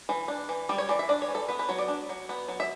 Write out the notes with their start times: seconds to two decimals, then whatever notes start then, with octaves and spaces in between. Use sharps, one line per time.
0.09 E3
0.28 D4
0.49 E3
0.69 G3 D5
0.78 C#5
0.89 E3 D5
0.99 E5
1.09 D4 D5
1.22 C#5
1.28 E3
1.35 A4
1.48 B3 B4
1.59 B4
1.69 F#3 C#5
1.78 D5
1.88 D4
2.09 F#3
2.29 B3
2.48 F#3
2.60 E5